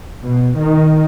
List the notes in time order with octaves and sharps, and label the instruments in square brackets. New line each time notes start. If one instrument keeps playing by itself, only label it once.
[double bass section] B2
D#3